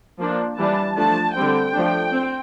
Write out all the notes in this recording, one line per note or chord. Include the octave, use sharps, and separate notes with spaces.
F3 A#3 D4
E3 G3 D4 A5
F3 A3 D4 A5
D3 G3 C4 G5
F3 A3 D4
C4